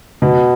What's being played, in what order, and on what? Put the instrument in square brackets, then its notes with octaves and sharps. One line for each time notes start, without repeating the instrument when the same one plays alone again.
[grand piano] B2